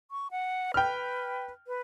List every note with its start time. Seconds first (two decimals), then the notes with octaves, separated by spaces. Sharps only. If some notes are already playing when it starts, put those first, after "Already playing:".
0.11 C#6
0.31 F#5
0.74 B4 G5 F6
1.67 B4